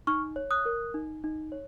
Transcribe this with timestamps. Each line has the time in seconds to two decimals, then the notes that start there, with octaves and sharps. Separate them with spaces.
0.07 D#4 C#6 F6
0.36 C#5
0.51 D#6 F#6
0.65 A#4
0.94 D#4
1.24 D#4
1.52 C#5